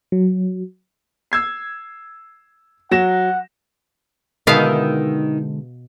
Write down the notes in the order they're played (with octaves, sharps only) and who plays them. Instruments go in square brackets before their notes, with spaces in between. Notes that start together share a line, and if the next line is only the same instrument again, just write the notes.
[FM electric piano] F#3
[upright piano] E6 G#6 C7
[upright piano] F#3 A#6 E7 [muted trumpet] F#5
[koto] B2 B3 F5 [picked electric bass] D3 G#3 [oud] D#3 E4